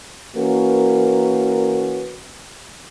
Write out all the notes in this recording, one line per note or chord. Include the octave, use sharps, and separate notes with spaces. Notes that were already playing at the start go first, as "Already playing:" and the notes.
E3 A#3 C#4 F#4 A#4 B4